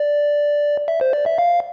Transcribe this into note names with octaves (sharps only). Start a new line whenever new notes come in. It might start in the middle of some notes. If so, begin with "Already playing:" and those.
Already playing: D5
E5
C5
D5
E5
F5